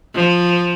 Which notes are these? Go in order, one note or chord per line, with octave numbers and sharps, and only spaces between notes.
F3